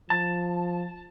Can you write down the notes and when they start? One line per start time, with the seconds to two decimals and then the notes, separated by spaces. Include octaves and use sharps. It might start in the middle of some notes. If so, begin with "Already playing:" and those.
0.10 F3 A5